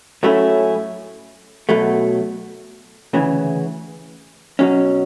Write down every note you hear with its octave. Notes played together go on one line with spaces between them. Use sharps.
A2 F#3 A3 C#4 E4
B2 F#3 A3
D2 C#3 E3
B2 F#3 C#4